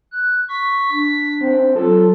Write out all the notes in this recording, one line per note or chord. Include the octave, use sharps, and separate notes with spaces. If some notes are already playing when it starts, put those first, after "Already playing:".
F#6
C#6 B6
D4
C4
F#3 F4 A4